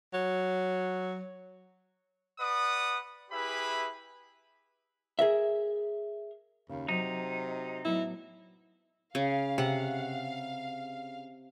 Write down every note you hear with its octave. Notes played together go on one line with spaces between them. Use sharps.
F#3
B4 D5 F#5 D#6
E4 G4 G#4 B4 E5 B5
G#4 A#4 E5
D#2 C#3
C3 F#3 D#4
A2 F#3 B3 E4
C#3 F5
C3 F#5